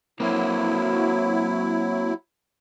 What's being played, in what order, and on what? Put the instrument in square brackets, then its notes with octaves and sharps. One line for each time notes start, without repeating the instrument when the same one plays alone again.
[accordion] F#3 E4 [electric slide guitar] A#3 C4